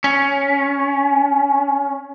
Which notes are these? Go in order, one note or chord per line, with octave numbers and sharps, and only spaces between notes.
C#4